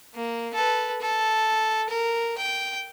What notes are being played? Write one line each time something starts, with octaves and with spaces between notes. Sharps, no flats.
A#3
A4 B4
A4
A#4
G5